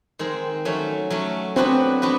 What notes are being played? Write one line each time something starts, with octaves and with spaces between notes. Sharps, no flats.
D#3 G#3 C4
F#3 A3 C#4
F#3 A3 C#4
F#3 B3 C4 D4 F#4 B4
B3 D4 F#4 B4